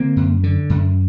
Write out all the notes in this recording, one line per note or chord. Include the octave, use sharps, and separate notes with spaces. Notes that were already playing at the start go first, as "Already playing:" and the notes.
Already playing: D3 A#3 C4
F#2
D3
F#2